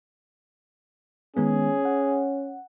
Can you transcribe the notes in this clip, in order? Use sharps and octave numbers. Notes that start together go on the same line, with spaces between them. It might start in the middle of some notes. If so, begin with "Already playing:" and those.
D#3 G#3 B3 C#4 G#4
F#5